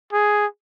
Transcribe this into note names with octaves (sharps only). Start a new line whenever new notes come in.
G#4